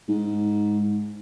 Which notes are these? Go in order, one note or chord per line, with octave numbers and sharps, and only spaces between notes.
G#2